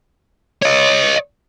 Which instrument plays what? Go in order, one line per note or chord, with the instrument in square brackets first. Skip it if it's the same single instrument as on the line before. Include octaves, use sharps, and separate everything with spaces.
[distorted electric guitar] C#5 D#5